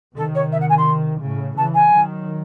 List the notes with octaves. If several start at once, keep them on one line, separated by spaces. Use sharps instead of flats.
C3 D#3 A4
C#5
E5
F#5
G#5
C6
A2 C#3
C#3 E3 A5
G#5
D#3 F#3